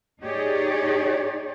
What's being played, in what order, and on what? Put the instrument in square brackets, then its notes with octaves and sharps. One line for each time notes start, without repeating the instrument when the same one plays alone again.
[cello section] D#4 G4 G#4 C#5 D5